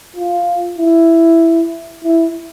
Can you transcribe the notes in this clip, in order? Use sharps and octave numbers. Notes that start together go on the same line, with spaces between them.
F4
E4
E4